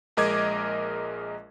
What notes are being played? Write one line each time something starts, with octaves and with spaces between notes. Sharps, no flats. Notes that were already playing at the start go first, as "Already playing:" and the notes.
A#1 G#3 A#4 D#5 D6 G#6